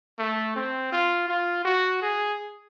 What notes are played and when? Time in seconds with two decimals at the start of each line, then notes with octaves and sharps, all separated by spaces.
0.19 A3
0.55 C4
0.92 F4
1.28 F4
1.65 F#4
2.02 G#4